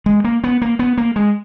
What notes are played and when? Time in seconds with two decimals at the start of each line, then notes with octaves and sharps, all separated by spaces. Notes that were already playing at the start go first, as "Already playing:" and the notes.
0.06 G#3
0.24 A#3
0.44 B3
0.62 A#3
0.79 B3
0.97 A#3
1.16 G#3